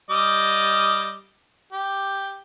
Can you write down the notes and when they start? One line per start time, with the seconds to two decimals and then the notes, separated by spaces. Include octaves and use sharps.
0.10 G3 D#5 D6
1.73 G4